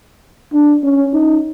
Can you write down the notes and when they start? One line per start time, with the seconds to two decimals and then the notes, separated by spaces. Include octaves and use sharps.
0.53 D4
0.83 C#4
1.14 D#4